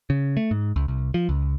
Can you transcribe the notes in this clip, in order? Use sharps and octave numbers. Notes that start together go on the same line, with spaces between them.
C#3
A3
G#2
C#2
C2
F3
C#2